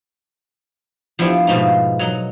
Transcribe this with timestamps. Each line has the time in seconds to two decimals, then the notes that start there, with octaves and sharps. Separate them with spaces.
1.19 F3 B3 D4 E4 G4
1.47 G#2 B2 F3 A3 D#4
1.99 F#3 D#4